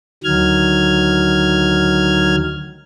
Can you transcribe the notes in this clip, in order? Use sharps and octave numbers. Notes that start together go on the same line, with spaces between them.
D2 D#3 F#3 F6 G#6